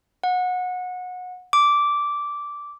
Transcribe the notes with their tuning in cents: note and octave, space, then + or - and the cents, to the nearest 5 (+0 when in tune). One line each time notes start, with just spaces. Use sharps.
F#5 -25
D6 -10